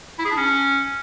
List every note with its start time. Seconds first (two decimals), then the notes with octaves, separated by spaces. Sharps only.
0.19 E4
0.25 G#4
0.31 D4
0.37 C#4